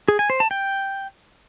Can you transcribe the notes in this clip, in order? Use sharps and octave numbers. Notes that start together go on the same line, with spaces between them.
G#4
G#5
C5
A5
G5